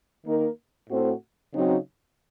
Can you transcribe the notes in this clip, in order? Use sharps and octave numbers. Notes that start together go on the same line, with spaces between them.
D#3 A#3 D#4 A#4
A2 A3 C4 F#4 C5
C#3 F#3 C4 D#4 F#4